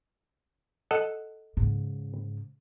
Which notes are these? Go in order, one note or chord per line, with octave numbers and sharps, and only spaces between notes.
A4 D#5 F#5
G#2 C#3